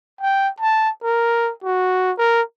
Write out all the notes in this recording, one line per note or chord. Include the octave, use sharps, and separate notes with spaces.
G5
A5
A#4
F#4
A#4